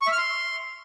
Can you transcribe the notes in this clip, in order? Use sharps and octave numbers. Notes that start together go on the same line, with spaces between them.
C#6
E5
F6
C6